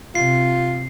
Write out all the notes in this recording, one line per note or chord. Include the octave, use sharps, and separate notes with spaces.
C3 F4 C7